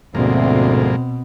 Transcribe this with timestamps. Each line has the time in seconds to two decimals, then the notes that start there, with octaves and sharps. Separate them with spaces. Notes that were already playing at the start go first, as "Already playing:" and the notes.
0.15 D2 G#2 B2 F3 A#3 C4